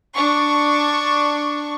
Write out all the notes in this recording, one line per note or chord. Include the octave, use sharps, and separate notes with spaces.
D4 C#6